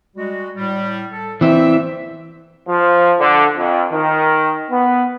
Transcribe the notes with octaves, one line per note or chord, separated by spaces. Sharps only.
G3 G#3 F#4
A2 G3
A4
E3 C4 E5
F3
D3
F2
D#3
B3